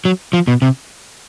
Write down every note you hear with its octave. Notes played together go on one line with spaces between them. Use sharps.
F#3
F3
B2
C3